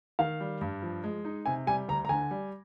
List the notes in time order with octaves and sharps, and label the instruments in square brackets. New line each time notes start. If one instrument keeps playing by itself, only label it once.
[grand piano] D#3 [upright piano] F5
[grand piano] G3
G2
F3
G#3
D#4
[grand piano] C3 [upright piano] G#5
[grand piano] G3 [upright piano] G#5
[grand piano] D2 [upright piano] A#5
[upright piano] A#5
[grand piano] D3 [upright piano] G#5
[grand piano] G3